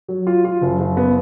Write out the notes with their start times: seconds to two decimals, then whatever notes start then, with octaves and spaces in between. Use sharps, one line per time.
0.08 F#3
0.27 F4
0.45 F4
0.62 F#1
0.79 F#1
0.97 B3